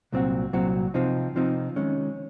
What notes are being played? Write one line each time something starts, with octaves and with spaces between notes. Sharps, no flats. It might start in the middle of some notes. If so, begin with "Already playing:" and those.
C2 A#2 F#3 C4 F#4
C2 A#2 F#3 C4 F#4
C3 F3 C4 D#4
C3 F3 C4 D#4
D#3 G#3 C#4